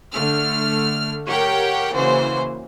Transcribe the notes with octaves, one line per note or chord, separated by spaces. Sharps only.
D3 A3 F6
G4 A#4 C#5 F#5 G5
C#3 E3 A#3 F#4 C5